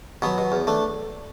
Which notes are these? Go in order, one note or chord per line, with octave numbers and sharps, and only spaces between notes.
B2 F#3 B3
B2
E2
A3 D4